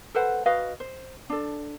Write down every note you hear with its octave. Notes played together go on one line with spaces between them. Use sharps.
A4 B4 C5 F#5
F#4 B4 D#5 F5
C5
D4 A4